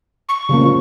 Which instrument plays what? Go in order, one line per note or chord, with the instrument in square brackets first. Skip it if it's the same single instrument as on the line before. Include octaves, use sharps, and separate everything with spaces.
[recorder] C#6
[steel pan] C#3 F3 A#3
F4